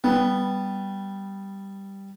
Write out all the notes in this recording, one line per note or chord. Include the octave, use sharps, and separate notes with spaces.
G3 B3